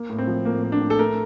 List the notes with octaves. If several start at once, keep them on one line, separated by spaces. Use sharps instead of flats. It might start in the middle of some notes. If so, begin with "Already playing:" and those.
Already playing: A#3
A2
C4
F3
A2 A#3
A#3
D4
A2
A4
A3 A#4